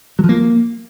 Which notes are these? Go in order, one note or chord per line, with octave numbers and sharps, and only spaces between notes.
F#3
F3
A#3